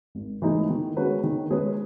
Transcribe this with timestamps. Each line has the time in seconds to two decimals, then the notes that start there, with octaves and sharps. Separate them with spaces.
0.15 G#1
0.42 G#2 E3 A3 D#4
0.70 D#3
0.97 G#3 C#4 F#4 B4
1.24 D#3
1.50 G#3 C#4 G#4 B4